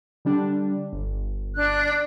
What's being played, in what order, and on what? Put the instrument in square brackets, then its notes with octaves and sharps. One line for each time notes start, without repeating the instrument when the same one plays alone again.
[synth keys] D3 G3 D4
G1
[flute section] D4 F#6